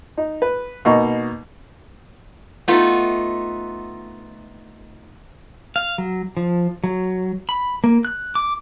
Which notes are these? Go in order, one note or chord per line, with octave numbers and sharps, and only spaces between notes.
D#4
B4
B2 A#3 D#4 C#6
A3 B3 D#4 F4
F5
F#3
F3
F#3
B5
A#3
F#6
D6